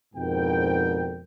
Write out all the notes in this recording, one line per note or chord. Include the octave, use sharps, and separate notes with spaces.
F2 G#2 B2 D3 A#4 G5